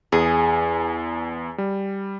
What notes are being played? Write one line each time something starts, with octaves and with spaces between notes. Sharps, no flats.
E2 G#4
G3